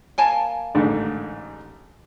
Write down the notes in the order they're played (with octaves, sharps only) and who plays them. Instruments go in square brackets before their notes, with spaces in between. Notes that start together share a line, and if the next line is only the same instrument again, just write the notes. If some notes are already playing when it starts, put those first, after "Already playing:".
[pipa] A#3 G#5 A5
[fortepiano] A1 G#2 D3